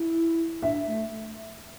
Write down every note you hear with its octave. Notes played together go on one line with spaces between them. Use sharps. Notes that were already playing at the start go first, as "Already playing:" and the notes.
Already playing: E4
D4 E5
A3